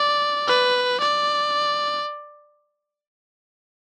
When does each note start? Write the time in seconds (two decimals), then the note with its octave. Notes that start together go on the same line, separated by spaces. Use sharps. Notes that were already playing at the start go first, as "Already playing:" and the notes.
Already playing: D5
0.48 B4
1.00 D5